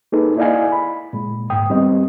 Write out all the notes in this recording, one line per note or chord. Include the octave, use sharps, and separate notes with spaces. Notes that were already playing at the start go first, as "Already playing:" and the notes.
A#3 D#4 G#4 A4 B4
E4 D5 D#5 F5 G#5
B5
A#2 G#3
D2 G#2 G5 D#6
G3 B3 C4 D#5